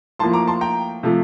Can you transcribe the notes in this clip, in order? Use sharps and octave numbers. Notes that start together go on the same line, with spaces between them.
A2 F3 A#3 A5 C6
A#5 D6
A5 C6
G5 A#5
C3 F3 A3